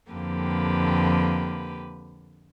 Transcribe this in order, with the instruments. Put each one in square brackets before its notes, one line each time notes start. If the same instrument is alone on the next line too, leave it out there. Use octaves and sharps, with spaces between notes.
[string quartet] F2 D3 A#3 G4 B4